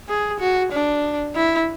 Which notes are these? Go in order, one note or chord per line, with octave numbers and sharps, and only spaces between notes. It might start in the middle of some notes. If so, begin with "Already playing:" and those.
G#4
F#4
D4
E4